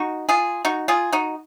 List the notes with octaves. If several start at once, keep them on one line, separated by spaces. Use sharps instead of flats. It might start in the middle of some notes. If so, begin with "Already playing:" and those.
Already playing: D#4 F#4
F4 G#4
D#4 F#4
F4 G#4
D#4 F#4